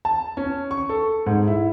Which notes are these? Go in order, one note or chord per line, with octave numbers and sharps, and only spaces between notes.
A5
C#4
C#6
A4
G#2
E4